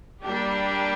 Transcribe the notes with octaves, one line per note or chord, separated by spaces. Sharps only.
G3 A#3 D4 G4